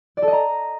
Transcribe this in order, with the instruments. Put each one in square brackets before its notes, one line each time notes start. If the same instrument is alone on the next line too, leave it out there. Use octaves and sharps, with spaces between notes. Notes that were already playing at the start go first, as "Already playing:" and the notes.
[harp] D5
A4
D#5
A#5